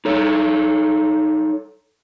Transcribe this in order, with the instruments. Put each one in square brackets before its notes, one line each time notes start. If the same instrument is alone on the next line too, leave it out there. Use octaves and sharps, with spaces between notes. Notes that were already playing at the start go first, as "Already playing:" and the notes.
[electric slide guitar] D#4 A4 C#5